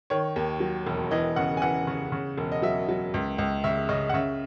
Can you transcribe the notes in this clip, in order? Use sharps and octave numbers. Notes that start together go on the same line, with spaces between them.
D#3 C#5
D#2
F#3
E1
E3 D#5
C#3 F#5
G#5
E3 F#5
C#3
C#3
E1
D#5
F#3 E5
F#3
C#2
C#2
C#3 E5
C#3 D#5
F#5
C#3 E5